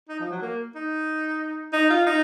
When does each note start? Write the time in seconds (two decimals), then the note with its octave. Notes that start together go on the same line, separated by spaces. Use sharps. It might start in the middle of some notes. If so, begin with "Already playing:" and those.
0.09 D#4
0.20 F3
0.31 F#3
0.42 A#3
0.75 D#4
1.73 D#4
1.90 F4
2.06 D#4